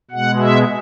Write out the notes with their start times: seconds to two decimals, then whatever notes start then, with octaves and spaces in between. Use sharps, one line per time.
0.11 B2 G#3 F#5
0.39 E5